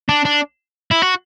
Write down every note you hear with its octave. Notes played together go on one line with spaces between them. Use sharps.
D4
D4
E4
F#4